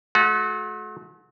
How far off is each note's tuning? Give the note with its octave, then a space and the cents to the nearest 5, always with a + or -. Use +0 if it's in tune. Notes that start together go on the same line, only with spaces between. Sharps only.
A3 -45 F#4 -30